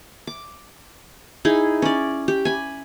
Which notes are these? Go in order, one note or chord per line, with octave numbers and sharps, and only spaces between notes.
D6
D#4 E4 G#4
C#4 D5
G4
G#5 B5